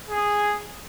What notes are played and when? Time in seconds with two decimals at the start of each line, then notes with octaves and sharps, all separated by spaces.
0.08 G#4